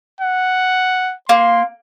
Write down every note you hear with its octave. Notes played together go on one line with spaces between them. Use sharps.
F#5
A#3 C6